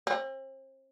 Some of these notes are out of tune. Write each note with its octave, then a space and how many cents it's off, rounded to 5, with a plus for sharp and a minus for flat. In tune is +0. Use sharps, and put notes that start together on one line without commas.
C4 +40